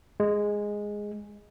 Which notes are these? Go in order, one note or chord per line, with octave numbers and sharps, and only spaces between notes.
G#3